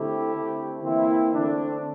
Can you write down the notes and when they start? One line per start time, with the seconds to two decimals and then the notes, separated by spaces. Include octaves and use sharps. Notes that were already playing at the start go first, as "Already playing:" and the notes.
Already playing: D3 A3 C4 E4 G4
0.33 D3 A3 C4
0.83 E3 A#3 C4 E4
1.34 D3 A3 C4 D4